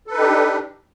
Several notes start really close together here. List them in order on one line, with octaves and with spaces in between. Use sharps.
A4 B4 D#4 G4 D4